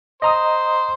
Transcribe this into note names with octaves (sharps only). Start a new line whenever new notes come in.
C5 D#5 A#5 D#6